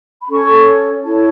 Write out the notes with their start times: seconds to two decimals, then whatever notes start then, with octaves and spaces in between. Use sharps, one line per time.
0.21 B5
0.30 C#4 A4 C#5 C#6
1.04 E4 A4 C#5 A5